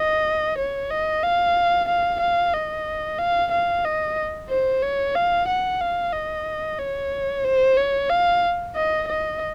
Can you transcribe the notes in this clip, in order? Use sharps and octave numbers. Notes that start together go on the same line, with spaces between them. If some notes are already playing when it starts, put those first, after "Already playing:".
Already playing: D#5
C#5
D#5
F5
F5
F5
D#5
F5
F5
D#5
C5
C#5
F5
F#5
F5
D#5
C#5
C5
C#5
F5
D#5
D#5